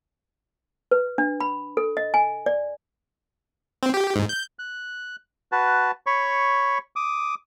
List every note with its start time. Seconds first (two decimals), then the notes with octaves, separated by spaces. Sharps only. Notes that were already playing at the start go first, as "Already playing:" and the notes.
0.91 B4
1.18 D4
1.40 B5
1.77 A4
1.97 D#5
2.14 G#5
2.46 D5
3.83 C4
3.94 G4
4.16 G#2
4.29 G6
4.59 F#6
5.52 F#4 B4 A5
6.06 C#5 B5 C#6
6.96 D6 D#6